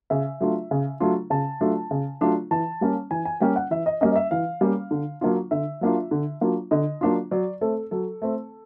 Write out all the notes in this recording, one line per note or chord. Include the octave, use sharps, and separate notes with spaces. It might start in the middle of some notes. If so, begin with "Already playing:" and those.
C#3 E5
F#3 A3 D4 F4
C#3
F#3 A3 D4 F4
C#3 A5
F#3 A3 D4 F4
C#3
F#3 A3 D4 F4
E3 A5
G3 A#3 C#4
E3 G#5
G#5
G3 A#3 C#4 G5
F#5
E3 E5
D#5
G3 A#3 C#4 D#5
D#5
E5
E3 F5
G3 A#3 C#4
D3
F#3 A#3 D4 F4
D3 E5
F#3 A#3 D4 F4
D3
F#3 A#3 D4 F4
D3 D#5
F#3 A#3 D4 F4
F#3 D5
A3 C4 A4
F#3 A4
A3 C4